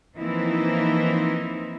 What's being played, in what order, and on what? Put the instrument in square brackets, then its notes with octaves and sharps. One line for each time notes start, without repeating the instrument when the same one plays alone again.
[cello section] E3 F3 A#3 C4 D#4 E4